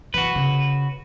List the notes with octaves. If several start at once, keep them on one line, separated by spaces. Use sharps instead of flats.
E3 F#4 B4
C#3